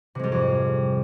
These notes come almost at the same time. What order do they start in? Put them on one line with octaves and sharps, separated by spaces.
C3 G#3 G3 G#2 F2